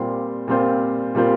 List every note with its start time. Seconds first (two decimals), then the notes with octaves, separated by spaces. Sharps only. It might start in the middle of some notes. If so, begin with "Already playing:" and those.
Already playing: A#2 G3 C4 F4 C5
0.47 A#2 G3 C4 F4 C5
1.15 A#2 G3 C4 F4 C5